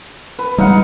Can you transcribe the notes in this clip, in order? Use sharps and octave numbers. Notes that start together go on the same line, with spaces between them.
B4
G3 G#3 D#4 F5 F#5